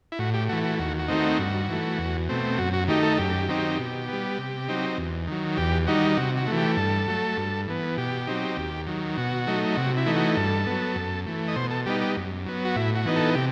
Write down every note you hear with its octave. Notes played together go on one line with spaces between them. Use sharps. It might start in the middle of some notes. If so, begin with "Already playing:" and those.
E4
A2 F#4
G4
E3 A3 F#4
F#4
D#2 F#4
F#4
D#3 A3 C4 D#4
F#4
G2
E3 A3
E2
B2 A3 C4
F#2 F#4
F#4
D#3 A3 D#4 G4
A4
F#2 G4
D#3 F#3 C4 D#4
B2
G3 B3
C3
F#3 C4 D#4
E2
D#3 F#3
E2 G4
D#3 G3 D#4 F#4
C3 F#4
F#4
E3 A3
G4
G2 A4
F#3 A3
G2
E3 B3
B2 G4
F#3 C4 D#4
D#2
D#3 F#3
B2 F#4
F#3 A3 D#4
C3 F#4
E4
E3 A3 D#4
F#4
G2 A4
F#3 B3
F#2
E3 A3
D#5
B2 C5
A4
G3 B3 D#4 G4
G4
F#2
F#3 B3
F#4
A2 E4
F#4
E3 B3 D#4
A4
C3 G4